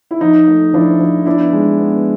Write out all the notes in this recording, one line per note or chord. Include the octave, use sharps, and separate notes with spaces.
E4
F3 D#4
A3
F3 D4 E4
F3
B3 D4 E4
G#3
B3